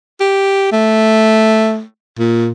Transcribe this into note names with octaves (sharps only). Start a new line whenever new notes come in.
G4
A3
A#2